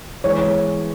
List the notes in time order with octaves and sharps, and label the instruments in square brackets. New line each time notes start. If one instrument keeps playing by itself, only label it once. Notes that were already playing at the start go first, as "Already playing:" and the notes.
[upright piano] E3 G#3 B3 [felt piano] C#5